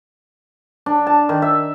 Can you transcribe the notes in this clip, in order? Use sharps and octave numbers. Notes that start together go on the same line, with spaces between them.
D4
A5
D#3
E5